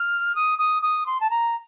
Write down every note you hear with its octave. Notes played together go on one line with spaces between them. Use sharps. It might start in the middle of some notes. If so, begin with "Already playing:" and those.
Already playing: F6
D#6
D#6
D#6
C6
A5
A#5